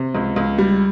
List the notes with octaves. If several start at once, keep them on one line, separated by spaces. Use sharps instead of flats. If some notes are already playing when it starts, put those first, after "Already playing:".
Already playing: C3
C#2
C#2
G3